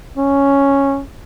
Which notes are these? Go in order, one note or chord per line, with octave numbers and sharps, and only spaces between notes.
C#4